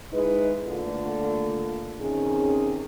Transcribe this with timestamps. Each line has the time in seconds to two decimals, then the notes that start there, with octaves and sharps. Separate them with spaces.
0.13 G#3 D#4 E4 B4
0.67 D3 A3 A#3 F4
2.00 C3 D#3 C#4 G#4